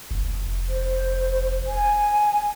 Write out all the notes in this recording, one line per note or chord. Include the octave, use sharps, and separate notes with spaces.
F1
C5
G#5